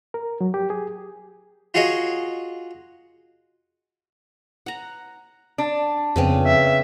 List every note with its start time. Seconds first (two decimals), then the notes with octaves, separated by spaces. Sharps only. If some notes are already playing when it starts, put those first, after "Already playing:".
0.14 A#4
0.41 F#3
0.54 G4
0.70 G#4
1.74 F4 F#4 G#4 C#5 D#5
4.66 F#5 A#5
5.58 D4
6.16 F2 C#3 B3 C4
6.47 E5